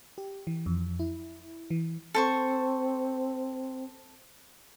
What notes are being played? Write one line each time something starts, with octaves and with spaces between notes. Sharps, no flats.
G4
E3
F2
E4
E3
C4 A4 C5 C#6